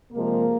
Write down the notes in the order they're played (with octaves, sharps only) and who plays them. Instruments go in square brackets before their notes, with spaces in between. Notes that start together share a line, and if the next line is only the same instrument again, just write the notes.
[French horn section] C3 F3 G#3 A#3 A#4